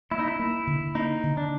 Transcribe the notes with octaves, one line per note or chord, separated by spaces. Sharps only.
A#3 E4
D#4
E4
A#3
D3
A#3 D#4
D3
D4